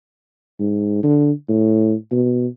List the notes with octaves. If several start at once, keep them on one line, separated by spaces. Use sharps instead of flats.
G#2
D3
A2
B2